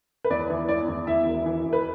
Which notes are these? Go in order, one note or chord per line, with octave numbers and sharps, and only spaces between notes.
B4
E2 D5
E3
E2 D5
E2
E2 E4 E5
E1
E3
E1
B4